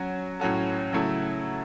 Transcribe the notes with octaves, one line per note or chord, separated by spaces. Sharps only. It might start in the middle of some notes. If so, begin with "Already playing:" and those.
Already playing: F#3 C#4 F#4
A2 F#3 C#4 F#4 A4
C#3 F#3 A3 E4 A4